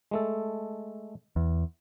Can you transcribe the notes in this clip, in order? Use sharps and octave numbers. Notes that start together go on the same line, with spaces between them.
G#3 A3 A4
E2